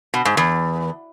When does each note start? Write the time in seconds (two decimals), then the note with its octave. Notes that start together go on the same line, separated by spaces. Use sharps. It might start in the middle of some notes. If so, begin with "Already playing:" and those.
0.14 B2
0.25 G#2
0.37 E2